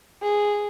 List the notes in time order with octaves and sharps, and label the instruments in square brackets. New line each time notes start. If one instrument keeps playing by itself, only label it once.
[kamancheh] G#4